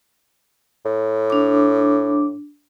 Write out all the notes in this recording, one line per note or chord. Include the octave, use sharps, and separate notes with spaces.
A2
D4 D6